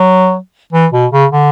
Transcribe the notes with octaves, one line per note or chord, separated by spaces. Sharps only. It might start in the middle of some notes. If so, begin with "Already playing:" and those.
Already playing: F#3
E3
B2
C#3
D3